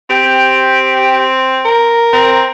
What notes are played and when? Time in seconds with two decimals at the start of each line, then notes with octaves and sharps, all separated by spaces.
0.10 C4 G4
1.65 A#4
2.13 C4